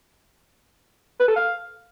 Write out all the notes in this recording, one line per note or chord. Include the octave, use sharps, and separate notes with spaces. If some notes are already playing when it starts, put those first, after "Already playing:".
B4
A4
F5